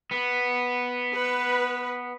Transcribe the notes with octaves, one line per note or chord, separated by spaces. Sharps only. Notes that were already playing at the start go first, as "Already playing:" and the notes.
B3
B4